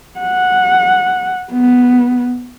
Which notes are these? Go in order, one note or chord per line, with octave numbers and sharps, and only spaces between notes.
F#5
B3